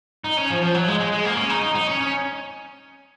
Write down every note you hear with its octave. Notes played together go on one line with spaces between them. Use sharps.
D#4
C#4
F3
F3
F#3
G#3
G#3
G#3
A#3
C#4
D#4
D#4
D#4
C#4
C#4